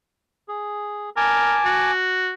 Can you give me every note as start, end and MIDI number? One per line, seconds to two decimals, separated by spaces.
0.48 1.10 68
1.17 1.58 70
1.17 1.91 80
1.17 1.91 81
1.17 1.91 86
1.65 2.32 66